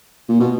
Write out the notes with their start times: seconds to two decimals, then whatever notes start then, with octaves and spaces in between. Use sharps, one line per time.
0.29 A#2
0.40 B2